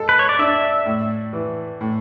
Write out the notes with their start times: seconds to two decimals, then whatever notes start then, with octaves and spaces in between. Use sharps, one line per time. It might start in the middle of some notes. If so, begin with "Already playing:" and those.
Already playing: G#3 A4
0.09 B4
0.19 C#5
0.29 D5
0.39 D4 E5
0.86 A2
1.33 E3
1.81 A2